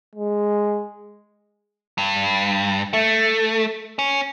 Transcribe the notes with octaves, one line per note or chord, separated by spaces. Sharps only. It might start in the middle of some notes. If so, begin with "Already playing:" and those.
G#3
G2
A3
C#4